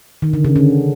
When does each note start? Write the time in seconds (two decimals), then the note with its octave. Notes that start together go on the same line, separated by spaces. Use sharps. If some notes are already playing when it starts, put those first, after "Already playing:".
0.22 D#3
0.33 D3
0.45 C#3
0.56 D3